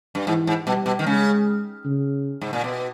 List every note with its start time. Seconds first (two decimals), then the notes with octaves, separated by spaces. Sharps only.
0.15 G2
0.27 G#2 E3
0.47 G#2
0.66 B2 G3
0.86 B2
0.99 D#3
1.06 C#3 G#3
1.85 C#3
2.41 G#2
2.53 A#2
2.64 B2